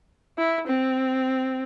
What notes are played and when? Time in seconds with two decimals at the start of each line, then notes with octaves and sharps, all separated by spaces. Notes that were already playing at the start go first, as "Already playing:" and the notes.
0.38 E4
0.67 C4